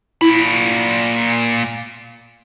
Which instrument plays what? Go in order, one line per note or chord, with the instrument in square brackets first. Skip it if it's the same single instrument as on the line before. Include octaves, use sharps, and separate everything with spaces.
[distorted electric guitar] A#2 B5 [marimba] E4